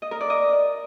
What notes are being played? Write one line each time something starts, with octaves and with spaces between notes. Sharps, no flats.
D#5
A#4
D5
D#5